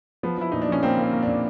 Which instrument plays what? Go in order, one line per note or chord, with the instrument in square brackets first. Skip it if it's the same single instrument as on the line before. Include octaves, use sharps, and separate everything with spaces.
[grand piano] F3 [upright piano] B3
[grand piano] F3 [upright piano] E4
[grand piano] A#2 [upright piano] D#4
[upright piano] D4
[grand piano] F3 [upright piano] C#4
[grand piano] A#3 [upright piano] C4
[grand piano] A#3
[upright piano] C4
[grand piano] A#3
[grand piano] A#2 [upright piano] D4